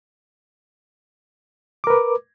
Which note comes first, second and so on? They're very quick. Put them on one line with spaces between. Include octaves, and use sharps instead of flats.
D6 A#4 B4